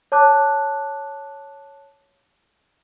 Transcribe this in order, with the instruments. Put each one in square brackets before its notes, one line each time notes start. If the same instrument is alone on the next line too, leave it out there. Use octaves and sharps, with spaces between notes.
[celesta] C#5 A5 D6 F#6